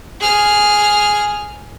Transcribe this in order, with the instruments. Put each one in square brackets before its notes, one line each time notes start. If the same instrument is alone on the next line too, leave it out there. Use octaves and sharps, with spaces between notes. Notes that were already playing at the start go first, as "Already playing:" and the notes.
[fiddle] G#4 F6